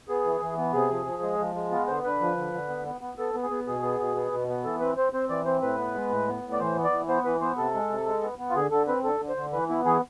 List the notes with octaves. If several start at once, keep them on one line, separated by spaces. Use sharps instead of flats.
B3 G#4
E3
E3
B3
C3 G#4
F3
F3
G#3
F3
G#3
B3 F4
D3 C5
D3 B4
F3
D3
D3
B3
B3
B3
B3 A4
B3
G#4
B3
B2 G#4
B3
B2
B3
B2
B3
E3 A4
C4 B4
C4 C5
C4 C5
E3 D5
C4 C5
A2 B4
B3
G#3
A2
B3
A2
D5
E3 C5
B3
D5
E3
B3 C5
E3 B4
B3 C5
C3 A4
G#3
C3
G#3
B3
B3
F4
D3 G#4
D3 A4
C4 B4
D3 A4
D3
C5
D3
E3 B4
B3 E4
E3 G#4